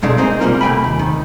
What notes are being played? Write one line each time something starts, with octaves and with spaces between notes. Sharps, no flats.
C#2 B2 G#3 A3 D#4 D5
A#3 C4 D#4 G#4
C2 G3 A#3 F4 A#4
C3 A3 G5 G#5 B5
D#2
D#3